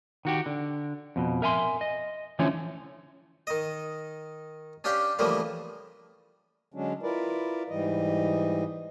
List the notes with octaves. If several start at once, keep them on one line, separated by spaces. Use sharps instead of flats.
D#3 F#4 G4
D3
F2 B2
A#4 E5 G#5 A#5 C6
D#5
D3 E3 F3 A3 C#4 C#5
D#3 D#5
C#4 D4 G4 F5 G5
C#3 E3 F3 G3 A3 A#3
D3 F#3 G#3 C#4 D4
E4 F4 A#4 B4 D5
G#2 E3 G3 D#5